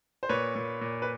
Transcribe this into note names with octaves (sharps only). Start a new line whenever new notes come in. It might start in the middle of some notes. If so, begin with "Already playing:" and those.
C5
A#2 B4 C#5
A#2
A#2
B4